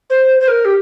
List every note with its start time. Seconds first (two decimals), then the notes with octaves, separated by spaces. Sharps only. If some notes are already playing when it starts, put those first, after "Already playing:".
0.10 C5
0.40 C5
0.48 A#4
0.65 G4